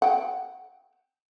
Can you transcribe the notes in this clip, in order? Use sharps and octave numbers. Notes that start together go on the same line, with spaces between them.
F#5 G5